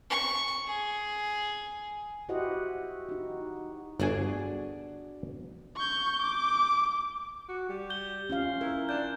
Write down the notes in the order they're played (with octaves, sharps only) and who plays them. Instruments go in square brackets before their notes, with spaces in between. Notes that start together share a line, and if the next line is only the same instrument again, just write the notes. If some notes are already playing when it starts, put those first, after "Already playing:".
[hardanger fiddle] C#6
G#4
[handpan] E4 F#4 G4 C5 D#5 F#5
D#4 F#4
[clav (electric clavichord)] G1 G#5 [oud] D4 F#4 G#4
[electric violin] C#6 G6
D6
[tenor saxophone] F#4
G3
[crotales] G6 G7
[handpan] C#4 F4 F5
[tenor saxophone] E4 [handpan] A#4
[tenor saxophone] D4 [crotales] G6